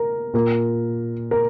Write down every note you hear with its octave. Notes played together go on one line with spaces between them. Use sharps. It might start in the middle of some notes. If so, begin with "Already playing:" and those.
Already playing: A#4
A#2 A#4
A#4